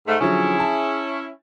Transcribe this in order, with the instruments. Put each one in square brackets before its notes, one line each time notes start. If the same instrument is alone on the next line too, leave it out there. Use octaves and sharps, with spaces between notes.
[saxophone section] G#2 A3
[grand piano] D3 F3 F#3 [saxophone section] C#4 E4 [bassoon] G#4
[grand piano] A5